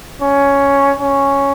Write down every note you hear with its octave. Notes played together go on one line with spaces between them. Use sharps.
C#4
C#4